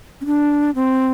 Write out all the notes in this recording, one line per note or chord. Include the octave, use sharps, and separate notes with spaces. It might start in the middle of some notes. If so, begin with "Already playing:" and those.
C#4
D4
C4